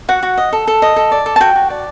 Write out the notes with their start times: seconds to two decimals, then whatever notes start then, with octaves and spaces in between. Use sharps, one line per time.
0.09 F#4 F#5
0.23 F#4
0.37 D#5
0.53 A4
0.67 A4
0.82 D#5
0.96 A4
1.12 D5
1.26 A4
1.36 A5
1.40 F#4 G5
1.56 F#4
1.70 D5